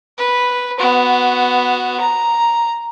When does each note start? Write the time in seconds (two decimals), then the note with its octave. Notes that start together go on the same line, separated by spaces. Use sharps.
0.18 B4
0.79 B3 F#4
2.00 A#5